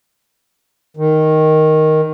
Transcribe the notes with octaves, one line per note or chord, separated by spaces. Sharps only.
D#3